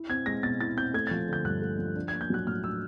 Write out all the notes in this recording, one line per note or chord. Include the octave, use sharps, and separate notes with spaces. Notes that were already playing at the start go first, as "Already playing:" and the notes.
Already playing: E4
C4 G#6
G#3 A#6
B2 A6
E4 A6
C4 G6
A3 G#6
A6
F3
D3 G6
G2 F#6
A3
F3
D4
G#6
A#3
G6
F#3 F#6
A2 F6
D4 E6